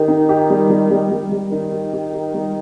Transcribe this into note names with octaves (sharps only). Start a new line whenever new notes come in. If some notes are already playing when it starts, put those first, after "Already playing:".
Already playing: D#3 G4
D#4
G4
G3
G3
G3
G3
G3
D#3 D#4
G4
G4
G4
G3